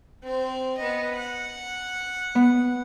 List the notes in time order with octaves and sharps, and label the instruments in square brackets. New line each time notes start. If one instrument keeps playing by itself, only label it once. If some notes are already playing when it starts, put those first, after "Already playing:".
[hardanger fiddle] C4 C5
B3 D#5
F#5
[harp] B3